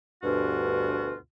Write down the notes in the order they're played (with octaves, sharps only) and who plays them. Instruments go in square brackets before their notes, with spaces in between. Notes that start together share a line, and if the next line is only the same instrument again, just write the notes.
[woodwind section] D2 G2 B2 F4 F#4